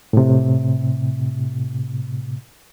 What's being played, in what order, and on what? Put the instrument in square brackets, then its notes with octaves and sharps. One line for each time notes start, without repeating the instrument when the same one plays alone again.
[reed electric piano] A2 C3